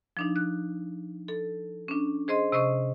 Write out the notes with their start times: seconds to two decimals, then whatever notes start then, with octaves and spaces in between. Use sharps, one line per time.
0.17 F3 D4 D#4
0.36 F#6
1.28 A4
1.88 C#4 D4
2.28 G#4 C5 D#5 C6
2.52 C3 C5 D#5 C#6 D#6